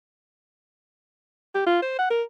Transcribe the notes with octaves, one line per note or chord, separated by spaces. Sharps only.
G4
F4
C5
F#5
A#4